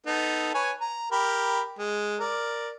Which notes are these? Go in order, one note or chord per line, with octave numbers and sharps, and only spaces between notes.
B3 D#4 A4
B4 C#5 G#5
A#5
G4 A#4 B5
G#3
A#4 D5